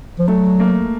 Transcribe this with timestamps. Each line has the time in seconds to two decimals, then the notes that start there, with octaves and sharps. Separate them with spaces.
0.19 F3
0.28 F#3 A3
0.60 A#3